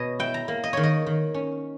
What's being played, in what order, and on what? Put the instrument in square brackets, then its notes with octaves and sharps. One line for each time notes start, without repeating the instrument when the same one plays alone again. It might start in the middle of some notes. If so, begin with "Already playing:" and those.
Already playing: [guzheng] B2 B4 C#5 D#5
E4 G5
A#5
A#3
D#5
D#3 C#5
D#5
D#3
C#4